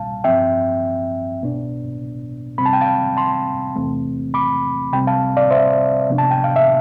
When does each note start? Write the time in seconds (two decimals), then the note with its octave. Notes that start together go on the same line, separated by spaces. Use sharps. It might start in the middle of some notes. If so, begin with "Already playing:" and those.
Already playing: C2 B2 G3 F5 A5
0.24 G2 F3 C4 E5 G5
1.41 C2 B2 B3 D4
2.58 C3 G3 C4 B5
2.66 A5
2.73 G5
2.81 F5 A5
3.17 A5 C6
3.76 E2 C3 E3 A3 C4
4.34 B5 D6
4.93 C2 C3 G3 C4 G5 B5
5.07 F5 A5
5.37 D5 F5
5.51 C5 E5
6.10 C3 F3 B3 D4
6.18 A5
6.31 G5
6.44 F5
6.56 E5